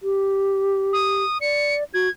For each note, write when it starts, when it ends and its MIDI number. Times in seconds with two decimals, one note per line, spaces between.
0.03 1.24 67
0.93 1.38 87
1.41 1.84 74
1.41 1.75 97
1.94 2.08 66
1.94 2.10 92